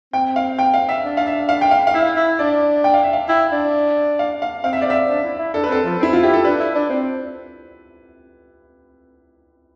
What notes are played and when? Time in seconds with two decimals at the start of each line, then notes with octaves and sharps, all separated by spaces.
0.13 C4 G5
0.36 F5
0.59 G5
0.74 F5
0.89 E5
1.04 D4
1.17 F5
1.27 E5
1.49 F5
1.61 G5
1.71 F5
1.87 F5
1.94 E4 E5
2.16 E4
2.39 D4 D5
2.84 G5
2.94 F5
3.03 E5
3.13 F5
3.28 E4 G5
3.52 D4
4.19 F5
4.42 F5
4.64 C4 F5
4.73 E5
4.81 D5
4.87 C4 E5
5.09 D4
5.24 E4
5.39 E4
5.54 D4 A4
5.63 B4
5.69 C4 A4
5.85 F3
5.99 C4 E4
6.13 F4
6.22 E4 G4
6.34 A4
6.44 D4 B4
6.60 E4
6.75 D4
6.90 C4